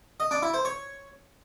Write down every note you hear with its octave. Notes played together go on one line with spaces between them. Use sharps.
D#5
D4
E4
C5
C#5